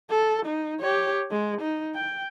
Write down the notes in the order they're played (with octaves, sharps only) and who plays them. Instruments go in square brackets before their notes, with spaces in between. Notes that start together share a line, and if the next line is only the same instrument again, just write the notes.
[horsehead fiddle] A4
D#4
G4 C#5
G#3
D#4
G5